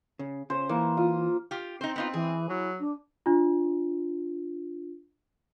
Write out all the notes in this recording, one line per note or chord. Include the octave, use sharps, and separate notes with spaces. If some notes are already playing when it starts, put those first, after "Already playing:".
C#3
C#3 C5
E3 A#3
F4 D#6
F4 G4
C4 D#4 C5
B3 D#4 F4
E3 G#4
F#3 E4
D4
D4 F4